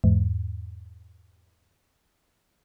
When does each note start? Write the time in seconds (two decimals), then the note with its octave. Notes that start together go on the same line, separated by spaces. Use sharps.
0.04 E2 G#2